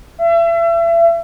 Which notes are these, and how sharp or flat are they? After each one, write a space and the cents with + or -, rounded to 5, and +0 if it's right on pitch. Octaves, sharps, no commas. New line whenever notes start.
E5 +35